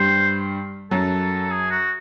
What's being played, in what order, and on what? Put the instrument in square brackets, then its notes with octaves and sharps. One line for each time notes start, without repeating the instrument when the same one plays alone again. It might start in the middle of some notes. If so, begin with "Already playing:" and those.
Already playing: [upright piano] G2 G3 [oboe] C5
[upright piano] F#2 F#3 [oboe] A4
[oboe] G#4
F#4